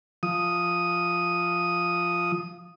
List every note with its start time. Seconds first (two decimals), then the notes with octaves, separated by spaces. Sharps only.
0.23 F3 D#6